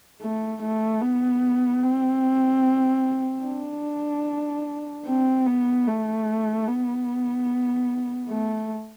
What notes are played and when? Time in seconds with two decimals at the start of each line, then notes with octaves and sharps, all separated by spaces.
0.21 A3
0.62 A3
1.02 B3
1.83 C4
3.45 D4
5.06 C4
5.46 B3
5.87 A3
6.67 B3
8.29 A3